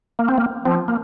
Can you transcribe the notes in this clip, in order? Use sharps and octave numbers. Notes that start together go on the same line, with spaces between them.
A#3
C4
A#3
F3 C4
A#3